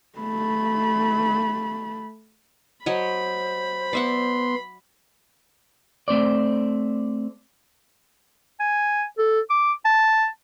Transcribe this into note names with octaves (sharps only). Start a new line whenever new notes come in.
A3 B5
F#3 C5 C#5 D#5 B5
B3 D5 E5 F#5 C6
A3 C4 C5 D5
G#5
A4
D6
A5